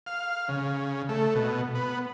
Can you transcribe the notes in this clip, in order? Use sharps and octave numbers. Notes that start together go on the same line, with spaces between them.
F5
C#3
A3
B2
B3